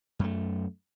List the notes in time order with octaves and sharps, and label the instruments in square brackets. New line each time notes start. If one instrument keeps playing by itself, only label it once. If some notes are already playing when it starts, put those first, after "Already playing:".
[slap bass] F#2 A3